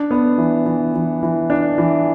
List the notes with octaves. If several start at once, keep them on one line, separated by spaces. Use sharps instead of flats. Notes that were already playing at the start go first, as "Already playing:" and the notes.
Already playing: D4
B3
E3
E3
E3
E3
D4
E3